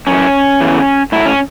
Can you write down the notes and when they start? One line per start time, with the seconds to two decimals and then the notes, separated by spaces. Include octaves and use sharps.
0.07 F#2 E3 C#4
0.60 E2 C#3 E3
1.12 A2 F#3 E4
1.26 C#4